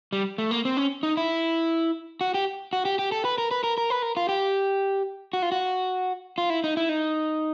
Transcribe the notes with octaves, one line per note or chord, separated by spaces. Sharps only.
G3
A3
A#3
C4
C#4
D#4
E4
F#4
G4
F#4
G4
G4
A4
B4
A#4
B4
A#4
A#4
B4
A#4
F4
G4
F#4
F4
F#4
F4
E4
D#4
E4
D#4